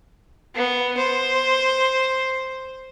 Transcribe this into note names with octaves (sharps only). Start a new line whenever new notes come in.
B3
C5